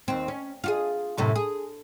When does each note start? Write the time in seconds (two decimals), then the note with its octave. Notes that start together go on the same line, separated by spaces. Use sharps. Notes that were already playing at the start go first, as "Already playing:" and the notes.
0.08 D#2 C4
0.28 C#4
0.64 F4 F#4 G#4
1.18 F#2 A2 C3
1.36 G#4